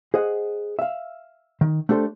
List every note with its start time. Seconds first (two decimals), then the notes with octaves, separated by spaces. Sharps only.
0.14 G#4 C5 D#5 F#5
0.79 E5 F5
1.61 D#3
1.89 A3 D4 G4 A4 C5